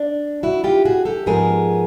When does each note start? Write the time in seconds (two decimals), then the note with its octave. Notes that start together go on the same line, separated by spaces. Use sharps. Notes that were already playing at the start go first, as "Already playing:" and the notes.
Already playing: D4
0.43 E4 F#4
0.64 F4 G4
0.85 F#4 G#4
1.05 G4 A4
1.26 G#2 F3 G#3 B3 G#4 A#4